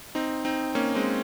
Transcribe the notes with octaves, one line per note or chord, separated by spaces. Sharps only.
C4 D#4
C4 D#4
A#3 C#4
G#3 C4